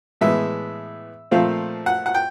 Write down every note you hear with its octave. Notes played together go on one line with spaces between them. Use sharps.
A2 E3 G#3 B3 E5
A#2 F3 A3 C4 F5
F#5
F#5
G5